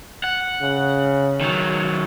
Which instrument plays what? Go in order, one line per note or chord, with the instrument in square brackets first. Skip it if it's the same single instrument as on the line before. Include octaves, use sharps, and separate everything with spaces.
[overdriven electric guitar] F#5
[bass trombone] C#3
[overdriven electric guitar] D#3 F#3